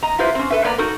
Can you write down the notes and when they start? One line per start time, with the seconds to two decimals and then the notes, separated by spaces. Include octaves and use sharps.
0.03 D#5 A#5
0.19 E4 F4 G4 B4 C5
0.35 C4 C#4
0.50 A4 B4 E5
0.64 A#3 B3 B4 D5 A#5
0.78 D#4 F#4 A4 A#4